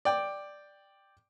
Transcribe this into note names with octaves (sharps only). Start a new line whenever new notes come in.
D5 G5